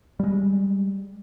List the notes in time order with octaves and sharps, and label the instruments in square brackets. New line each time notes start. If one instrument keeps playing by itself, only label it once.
[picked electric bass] G3 G#3